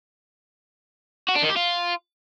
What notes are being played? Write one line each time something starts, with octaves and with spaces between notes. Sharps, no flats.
F#4
D4
D#3
G4
F4